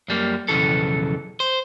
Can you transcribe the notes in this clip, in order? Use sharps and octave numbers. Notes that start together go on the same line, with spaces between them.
F#2 G3 A#3
B1 F2 G#2 C#3 E3 A4
C5